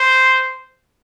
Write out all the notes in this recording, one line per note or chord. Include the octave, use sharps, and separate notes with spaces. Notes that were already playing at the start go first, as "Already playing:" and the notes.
Already playing: C5